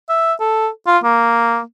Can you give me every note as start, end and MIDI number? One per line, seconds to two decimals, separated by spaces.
0.09 0.33 76
0.40 0.68 69
0.87 0.98 65
1.04 1.60 58